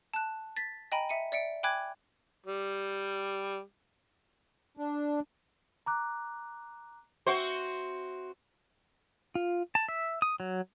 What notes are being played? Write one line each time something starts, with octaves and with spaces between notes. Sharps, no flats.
A5 F#6
A6 B6
D#5 G5 G#5 A#5 B5
E5 C#7 D#7
D5 E5 C#7 D7
G5 G#5 B5 D6 F#6 G#6
G3
D4
A#5 D6 F#6
C4 F#4 C5 E5
F4
A5
E5
D#6
F#3